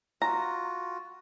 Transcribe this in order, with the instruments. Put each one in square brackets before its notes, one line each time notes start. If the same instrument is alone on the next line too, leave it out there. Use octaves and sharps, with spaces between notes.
[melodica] F4 F#4 [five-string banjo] A#5